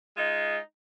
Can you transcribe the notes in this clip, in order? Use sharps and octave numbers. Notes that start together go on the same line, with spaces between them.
G#3 D#4 F4